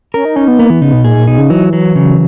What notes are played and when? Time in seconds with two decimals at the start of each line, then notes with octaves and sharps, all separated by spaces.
0.14 C#4 A#4
0.25 D#4
0.36 C#4 D#4
0.48 B3
0.59 A#3 B3
0.70 E3
0.81 C#3 D#4
0.93 B2
1.04 A#2 G#4
1.16 A#2
1.27 B2 D#4
1.38 C#3
1.50 E3 F#3
1.73 F#3
1.96 C#3